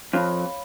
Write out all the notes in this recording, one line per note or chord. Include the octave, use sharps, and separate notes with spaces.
F2 C#5 F5 B5